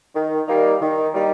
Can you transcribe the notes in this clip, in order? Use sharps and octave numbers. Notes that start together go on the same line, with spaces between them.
D#3
G3 A#3 D#4
D#3
G3 A#3 D#4